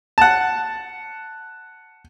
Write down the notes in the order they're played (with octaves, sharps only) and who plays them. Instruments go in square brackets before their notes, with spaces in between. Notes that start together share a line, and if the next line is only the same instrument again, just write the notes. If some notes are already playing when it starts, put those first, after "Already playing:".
[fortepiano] F#5 A5